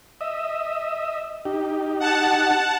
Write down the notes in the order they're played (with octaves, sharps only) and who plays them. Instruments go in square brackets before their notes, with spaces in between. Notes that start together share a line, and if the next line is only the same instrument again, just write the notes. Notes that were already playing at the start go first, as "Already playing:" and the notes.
[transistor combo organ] D#5 E5
D#4 G4
[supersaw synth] F#5 A5